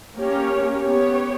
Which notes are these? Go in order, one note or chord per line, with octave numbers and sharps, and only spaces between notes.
A#3 C#4 G4 C#5
B3 G4 C#5